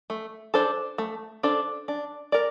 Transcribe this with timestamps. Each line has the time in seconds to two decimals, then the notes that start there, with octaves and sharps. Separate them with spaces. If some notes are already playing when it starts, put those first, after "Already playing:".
0.10 A3
0.54 D4 A4 C5
0.98 A3
1.43 D4 A4 C5
1.88 D4
2.32 A#4 D5